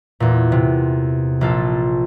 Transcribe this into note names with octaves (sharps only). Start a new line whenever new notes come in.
E2 A#2
C3
A#1 F4 A4